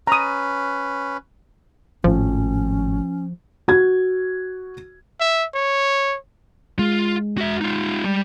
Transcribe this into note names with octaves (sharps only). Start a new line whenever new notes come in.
C#4 B4 A#5 D#6
G#1 A2 F3 C#4
F#4 G#6
E5
C#5
G#3 F4
F#4 E5
D#4 F4
G3